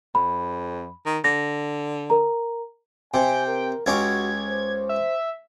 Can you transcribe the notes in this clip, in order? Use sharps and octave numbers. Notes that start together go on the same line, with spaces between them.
F2 B5
D#3
D3 A#6
A#4 A#5
C3 G5 G#5
A#4
C#2 C#4 F#4 G4 G#6
C5
E5